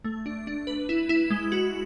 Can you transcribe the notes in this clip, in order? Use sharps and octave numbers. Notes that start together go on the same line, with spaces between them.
A3
D4
D4
B4
E4
E4
G#3
F#4